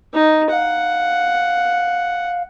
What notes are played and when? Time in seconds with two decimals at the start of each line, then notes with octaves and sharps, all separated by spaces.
0.14 D#4
0.52 F5 F#5